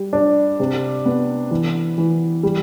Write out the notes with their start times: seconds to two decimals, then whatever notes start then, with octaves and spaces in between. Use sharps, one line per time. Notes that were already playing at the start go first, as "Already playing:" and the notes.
Already playing: G3
0.13 D4
0.60 C3
1.06 B3
1.51 E3
1.98 E3
2.43 G3